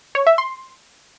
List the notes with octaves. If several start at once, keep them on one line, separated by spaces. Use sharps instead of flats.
C#5
E5
C6